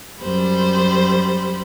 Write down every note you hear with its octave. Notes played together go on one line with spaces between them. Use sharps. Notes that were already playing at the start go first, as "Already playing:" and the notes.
F#2 G3 C5 B5